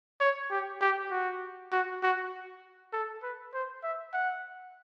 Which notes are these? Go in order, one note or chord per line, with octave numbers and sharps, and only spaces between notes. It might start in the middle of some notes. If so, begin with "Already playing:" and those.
C#5
G4
G4
F#4
F#4
F#4
A4
B4
C5
E5
F#5